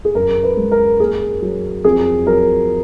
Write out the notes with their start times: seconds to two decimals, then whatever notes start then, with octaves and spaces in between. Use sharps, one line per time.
0.05 G#4
0.15 F#2 A#4
0.43 B4
0.57 G#3
0.71 A#4
1.00 A#3 G#4
1.42 F#3
1.84 F2 G#4
2.26 F#3 A#4